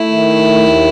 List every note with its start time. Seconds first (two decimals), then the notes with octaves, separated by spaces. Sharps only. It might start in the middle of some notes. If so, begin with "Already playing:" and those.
Already playing: A3 E4
0.09 D#3
0.54 D#2